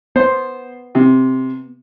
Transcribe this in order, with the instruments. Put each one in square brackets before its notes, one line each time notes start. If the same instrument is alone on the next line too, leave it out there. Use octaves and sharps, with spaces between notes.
[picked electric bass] B3 [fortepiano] C5
[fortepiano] C3